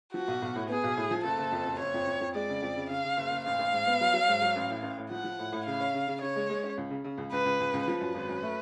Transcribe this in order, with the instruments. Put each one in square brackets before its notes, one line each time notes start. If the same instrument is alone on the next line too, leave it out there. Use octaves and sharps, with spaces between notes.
[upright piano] F3 [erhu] F#4
[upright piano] B1
B1
A2
[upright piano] B3 [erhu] G#4
[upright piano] B1
A2
F3
[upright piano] F#1 [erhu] A4
[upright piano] F#1
F2
F#1
[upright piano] F#1 [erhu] C#5
[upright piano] F2
F2
F2
[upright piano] G#3 [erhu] D5
[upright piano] C#3
F2
C#3
[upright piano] C#3 [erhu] F5
[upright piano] C#3
F#1
F#1
[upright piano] A1 [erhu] F5
[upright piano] A1
G#2
B3
F#3
F#3
G#2
F#3
A1
A2
A1
A2
[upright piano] F3 [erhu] F#5
[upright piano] F3
A2
A2
[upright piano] C#3 [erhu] F5
[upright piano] C#4
C#3
C#3
[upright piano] C#3 [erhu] C#5
[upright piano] G#3
G#3
C#4
C#2
C#3
C#3
C#2
[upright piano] C#2 [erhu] B4
[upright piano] C#2
C#2
C#2
[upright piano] F3 [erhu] B4
[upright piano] F#2
G#1
F#2
A3